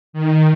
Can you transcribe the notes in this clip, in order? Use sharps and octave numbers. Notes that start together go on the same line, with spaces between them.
D#3